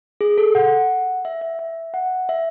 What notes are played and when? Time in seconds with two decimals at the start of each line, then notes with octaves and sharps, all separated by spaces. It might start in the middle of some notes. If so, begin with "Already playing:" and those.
0.21 G#4
0.38 A4
0.55 F#5
1.25 E5
1.41 E5
1.59 E5
1.94 F#5
2.29 E5